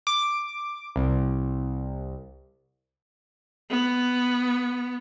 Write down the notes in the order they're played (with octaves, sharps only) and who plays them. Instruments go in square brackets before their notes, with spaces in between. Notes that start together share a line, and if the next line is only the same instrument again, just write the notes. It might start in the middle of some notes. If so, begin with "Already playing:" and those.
[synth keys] D6
C2
[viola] B3